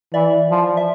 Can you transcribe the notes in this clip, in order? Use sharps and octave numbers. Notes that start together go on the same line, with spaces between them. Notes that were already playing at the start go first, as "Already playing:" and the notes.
E3 D5 E5
F3
E5